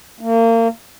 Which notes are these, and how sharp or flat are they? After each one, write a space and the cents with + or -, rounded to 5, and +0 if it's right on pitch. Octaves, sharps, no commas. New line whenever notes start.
A#3 -35